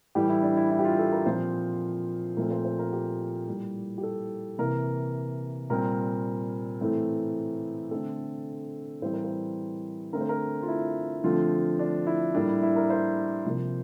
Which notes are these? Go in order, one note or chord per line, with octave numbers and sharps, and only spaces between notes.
A2 E3 G3 G4
E4
D4
E4
E4
G4
F4
A4
A#4
A#2 F3 C4 C5
A#2 F3 A3 C4 A#4
C5
C5
A#4
G4
A2 G3 A#3
G4
A4
C3 E3 A#3 A#4
A#2 G3 C4 A#4
A2 E3 A3 C4
D3 A3 C4 A4
A2 E3 G3 C4 C5
A#4
C5
D3 A3 C4 A#4
C5
A#4
F4
E4
D3 F3 A3 C4 F4
D4
E4
A2 G3 A#3 D4
E4
E4
A#4
C5
C3 F3 A#3